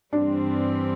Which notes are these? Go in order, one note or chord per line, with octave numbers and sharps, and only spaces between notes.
G2 E3 G3 C4 D4